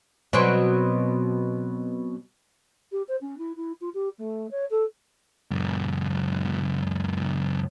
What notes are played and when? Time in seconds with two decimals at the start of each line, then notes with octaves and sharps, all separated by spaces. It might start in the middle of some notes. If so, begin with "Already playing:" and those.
0.33 B2 F#3 C4
2.92 G4
3.08 C5
3.21 C#4
3.38 E4
3.56 E4
3.81 F4
3.94 G4
4.18 A3
4.51 C#5
4.70 A4
5.51 C#2 F#2